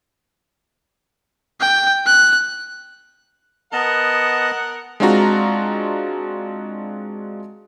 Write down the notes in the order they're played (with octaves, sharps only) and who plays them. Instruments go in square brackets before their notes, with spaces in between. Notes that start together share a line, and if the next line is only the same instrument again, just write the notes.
[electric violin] G5
F#6
[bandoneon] B3 D#5 A5 [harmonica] A#4 F#5
[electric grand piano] G#3 C4 D4 F4 F#4 A#5